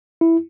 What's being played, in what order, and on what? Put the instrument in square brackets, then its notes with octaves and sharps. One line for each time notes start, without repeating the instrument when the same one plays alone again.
[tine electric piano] E4